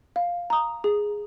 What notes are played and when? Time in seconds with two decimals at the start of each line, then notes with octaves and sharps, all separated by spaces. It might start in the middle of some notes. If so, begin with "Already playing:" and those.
0.16 F5
0.50 A#5 D#6
0.84 G#4